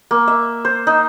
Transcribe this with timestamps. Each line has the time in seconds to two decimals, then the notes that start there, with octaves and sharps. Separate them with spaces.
0.11 A#3
0.28 E5
0.65 C5
0.87 D#4